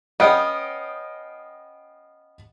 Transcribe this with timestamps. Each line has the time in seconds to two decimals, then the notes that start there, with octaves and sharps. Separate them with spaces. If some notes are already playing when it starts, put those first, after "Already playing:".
0.20 B3 C#4 D#5 F5 G5